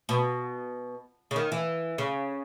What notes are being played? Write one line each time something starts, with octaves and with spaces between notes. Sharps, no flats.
B2
C#3
D#3
E3
C#3